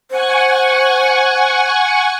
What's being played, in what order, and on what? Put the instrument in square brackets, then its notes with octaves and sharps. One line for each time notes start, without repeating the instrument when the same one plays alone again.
[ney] C5 [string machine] F#5 G#5 C#6